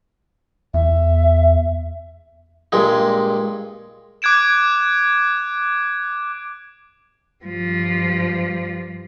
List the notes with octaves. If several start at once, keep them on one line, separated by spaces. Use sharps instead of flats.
E2 E5
G2 A#2 G#3
D6 F#6 G#6 D7 E7
G2 F3